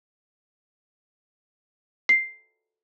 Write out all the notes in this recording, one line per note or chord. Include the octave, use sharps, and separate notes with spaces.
C7